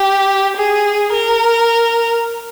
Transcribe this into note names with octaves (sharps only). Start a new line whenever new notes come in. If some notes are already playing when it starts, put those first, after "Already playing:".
Already playing: G4
G#4
A#4